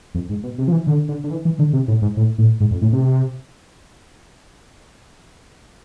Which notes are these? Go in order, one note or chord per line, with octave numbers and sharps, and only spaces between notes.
F2
G#2
B2
C3
F3
E3
D3
D3
D3
E3
E3
D3
C3
A2
G#2
A2
A2
G#2
F2
A2
C3